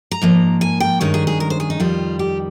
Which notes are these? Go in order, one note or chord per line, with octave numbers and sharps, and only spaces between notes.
A#5
G#2 F3 A#3
G#5
G5
G2 D#3 G#3 C#4 A#4
G#4
G#4
A#4
C5
G#4
D#4
F2 D#3 G3 F4
G4